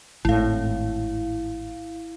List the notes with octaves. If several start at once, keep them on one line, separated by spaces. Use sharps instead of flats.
G#1 A2 E4 F5